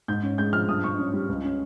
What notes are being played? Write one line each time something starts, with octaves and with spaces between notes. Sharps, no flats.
G#2 G6
C#4
G#3 G6
F3 F6
G2 D#6
G2 C#6
C#4
G3
C#2
C#4